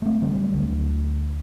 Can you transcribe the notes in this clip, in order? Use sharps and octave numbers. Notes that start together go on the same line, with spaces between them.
A3 C4
D3 F#3 G3
D2